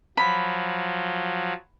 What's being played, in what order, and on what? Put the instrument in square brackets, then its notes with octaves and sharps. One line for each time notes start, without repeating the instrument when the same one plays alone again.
[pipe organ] F3 F#3 [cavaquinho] B5